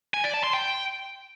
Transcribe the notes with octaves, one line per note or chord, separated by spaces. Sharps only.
G#5
D5
A5
C6
G5